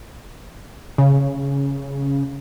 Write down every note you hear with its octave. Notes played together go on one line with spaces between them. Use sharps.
C#3